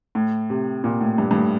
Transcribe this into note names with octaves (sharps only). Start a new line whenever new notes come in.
A2
C3
A#2
A2
G2
G2
A2